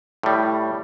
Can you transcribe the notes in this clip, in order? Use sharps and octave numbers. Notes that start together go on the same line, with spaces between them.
A2 G3